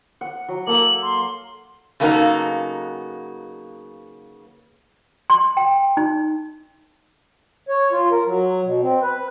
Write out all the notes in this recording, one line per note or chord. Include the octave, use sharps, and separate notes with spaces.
F#5
F#3
A#3 A4 E5 F#7
C6
C#3 F#3 A#3 B3 D#4 A4
C6
G5
D#4
C#5
F4
A#4
F#3
B2
C4
B4